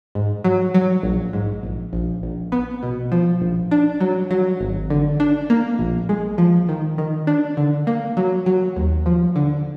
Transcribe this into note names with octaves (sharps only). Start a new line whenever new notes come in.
G#2
F#3
F#3
A#1
G#2
A#1
A#1
A#1
B3
B2
F3
A#1
D4
F#3
F#3
G#1
D3
D4
A#3
A#1
G#3
F3
D#3
D#3
D4
D3
A#3
F#3
F#3
D#2
F3
D3